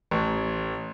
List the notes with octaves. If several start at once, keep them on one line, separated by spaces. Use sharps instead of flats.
A1